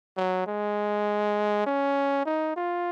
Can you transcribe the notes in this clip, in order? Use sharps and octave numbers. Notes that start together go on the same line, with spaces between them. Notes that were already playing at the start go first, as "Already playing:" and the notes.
F#3
G#3
C#4
D#4
F4